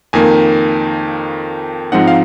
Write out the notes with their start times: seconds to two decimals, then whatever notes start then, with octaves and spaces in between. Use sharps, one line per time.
0.13 F2 D#3 A#3 G#5
1.92 G#2 F3 G#3 C4 D#4 F#5
2.08 F5